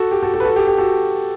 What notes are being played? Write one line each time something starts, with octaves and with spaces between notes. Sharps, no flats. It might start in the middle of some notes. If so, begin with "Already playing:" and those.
Already playing: F#4 A4
G4
F#4 A4
F#4 A4
B4
F#4 A4
G4
G4
F#4 A4